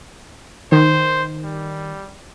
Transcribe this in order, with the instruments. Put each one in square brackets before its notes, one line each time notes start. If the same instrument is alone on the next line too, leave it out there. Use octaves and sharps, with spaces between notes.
[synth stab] D#3 [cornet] C5
[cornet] G3